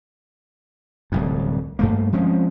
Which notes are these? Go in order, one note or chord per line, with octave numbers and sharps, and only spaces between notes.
D1 C2 F2
G2 A3 A#3
F3 G#3 C4 C#4